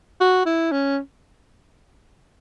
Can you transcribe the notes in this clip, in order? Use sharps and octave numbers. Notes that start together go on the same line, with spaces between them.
F#4
E4
C#4